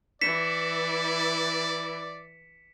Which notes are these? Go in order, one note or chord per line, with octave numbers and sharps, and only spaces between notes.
E3 E4 D5 B6 C#7 E7